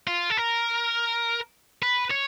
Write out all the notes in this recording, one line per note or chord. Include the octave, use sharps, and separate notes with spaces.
F4
A4
A#4
B4
C#5